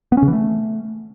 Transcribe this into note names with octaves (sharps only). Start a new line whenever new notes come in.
B3
C#4
C#3
E3
A3